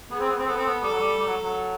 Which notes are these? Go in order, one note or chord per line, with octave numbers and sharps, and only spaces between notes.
B3 G#4
C4
B3
C4
B3 A4
C4
B3
G3 A4
F#3
G3
G3
F#3
F#3